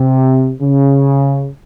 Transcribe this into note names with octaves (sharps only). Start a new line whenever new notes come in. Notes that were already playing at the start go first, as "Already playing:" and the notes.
Already playing: C3
C#3